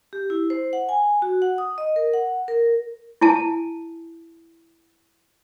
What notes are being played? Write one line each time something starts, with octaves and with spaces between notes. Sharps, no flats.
G4
E4
C5
F#5
G#5
F#4
F#5
D#6
D#5
A#4
F#5
A#4
E4 G#5 A5